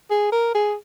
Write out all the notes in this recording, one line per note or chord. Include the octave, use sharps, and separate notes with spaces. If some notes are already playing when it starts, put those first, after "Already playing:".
G#4
A#4
G#4